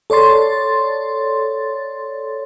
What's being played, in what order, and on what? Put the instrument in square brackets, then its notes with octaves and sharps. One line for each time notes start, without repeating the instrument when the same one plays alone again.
[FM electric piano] A4 C#5 D5 C6 A6